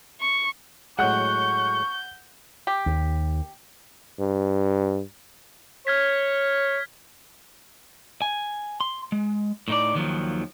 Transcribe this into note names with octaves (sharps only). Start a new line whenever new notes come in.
C#6
A2 F#3 G#3 F#5 C#6 F#6 G6
G4
D#2
G2
C#5 F6 G#6 B6
G#5
C6
G#3
A2 D#4 D5
D#2 D#3 F3 F#3